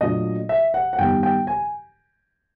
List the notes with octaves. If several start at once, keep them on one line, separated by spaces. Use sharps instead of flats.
A#2 F#3 A3 D4 D#5
E5
F#5
F#5
G2 D#3 G3 B3 G5
G5
G#5